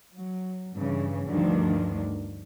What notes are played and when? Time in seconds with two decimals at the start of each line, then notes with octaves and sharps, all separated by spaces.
0.14 F#3
0.75 G2 C#3 E3
1.27 D2 G2 D#3 F3 D4